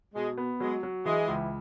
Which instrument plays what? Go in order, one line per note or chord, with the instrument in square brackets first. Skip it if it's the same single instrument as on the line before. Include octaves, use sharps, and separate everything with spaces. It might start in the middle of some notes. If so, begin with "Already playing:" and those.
[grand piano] B2 [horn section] G#3
[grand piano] B3
[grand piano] F#3 [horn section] G#3
[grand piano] F#3
[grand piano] E3 [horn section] G#3
[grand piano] C#2